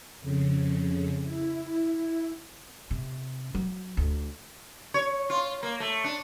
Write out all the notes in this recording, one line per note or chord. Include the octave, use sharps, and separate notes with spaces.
F2 C#3
E4
C3
F#3
D2
C#5
F4
A#3
A3
D4